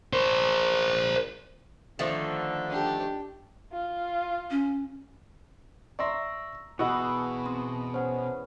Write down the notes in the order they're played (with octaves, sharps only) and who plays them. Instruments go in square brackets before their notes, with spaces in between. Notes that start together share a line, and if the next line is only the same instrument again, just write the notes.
[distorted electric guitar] A#4 C5
[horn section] D3 [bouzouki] D#3 F3 A3
[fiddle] D4 G4
[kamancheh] F4
[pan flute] C#4
[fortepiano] D5 E5 C6 [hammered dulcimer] A#5 [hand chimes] C#6 E6 A#6
[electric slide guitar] B2 [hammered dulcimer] E3 B3 G#4 [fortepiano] F#4 D#5 [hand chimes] F#5 E6
[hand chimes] C4 C6 D#6
[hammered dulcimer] C#4 [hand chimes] C5 F#5